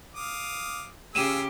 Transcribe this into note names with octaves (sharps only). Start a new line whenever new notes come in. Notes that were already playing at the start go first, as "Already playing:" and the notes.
F5 D6 D#6
C#3 F4 G4 G#4 E6 D#7 E7